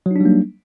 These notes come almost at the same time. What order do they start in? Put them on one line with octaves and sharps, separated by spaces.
F#3 D#4 D4 G3 A#3